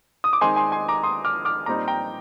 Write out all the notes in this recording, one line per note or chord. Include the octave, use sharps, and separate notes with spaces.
D#6
D6
D#3 G#3 C4 D#4 G#5 C6
G#5 C6
G#5 C6
A#5 D6
C6 D#6
D6 F6
D6 F6
A#2 G3 C4 D#4 A#5 D6
G5 A#5